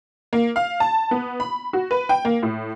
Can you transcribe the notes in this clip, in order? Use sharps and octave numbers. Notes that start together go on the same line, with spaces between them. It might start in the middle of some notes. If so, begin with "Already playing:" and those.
A#3
F5
A5
B3
B5
F#4
B4
G5
A#3
A2